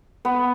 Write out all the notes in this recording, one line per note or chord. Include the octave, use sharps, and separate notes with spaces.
B3